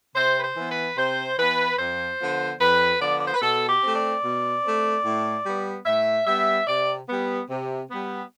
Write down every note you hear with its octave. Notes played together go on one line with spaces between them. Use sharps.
C3 C5
B4
C5
E3 B3
B4
C3 C5
E3 B3 B4
F2 C5
D3 F3 B3
F2 B4
D3 F3 B3 D5
D5
C5
B4
B2 A4
G4
A3 C4
D5
B2
A3 C4
A2
G3 B3
A2 E5
G3 B3 E5
C3 D5
G3 B3
C3
G3 B3